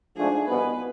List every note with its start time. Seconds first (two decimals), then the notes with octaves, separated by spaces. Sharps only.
0.16 G#2 F3 A3 D4 G#4
0.48 C2 B2 B3 B4